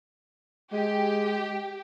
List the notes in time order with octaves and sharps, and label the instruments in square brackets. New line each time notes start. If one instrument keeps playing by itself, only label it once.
[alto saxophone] G#3 [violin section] G4